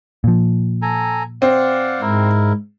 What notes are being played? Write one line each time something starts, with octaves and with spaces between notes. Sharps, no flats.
A#2 F3
A4 G#5 A#5
C4 D5 F5 F#5
G#2 E4 A#4